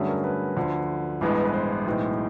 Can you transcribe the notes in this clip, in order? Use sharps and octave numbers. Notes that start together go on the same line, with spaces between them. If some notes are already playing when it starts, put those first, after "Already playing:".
Already playing: G2 D3 F#3 A3 C#4 G#4
A#4
B4
D2 D3 F3
A1 G2 E3 G#3 B3
B4
C5
B1 A2 E3 G#3